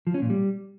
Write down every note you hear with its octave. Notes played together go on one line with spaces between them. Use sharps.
F3
C#4
A#2
G3